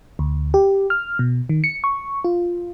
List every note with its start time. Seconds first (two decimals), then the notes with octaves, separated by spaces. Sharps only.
0.19 D2
0.54 G4
0.90 F6
1.19 B2
1.49 D#3
1.64 C#7
1.84 C#6
2.24 F4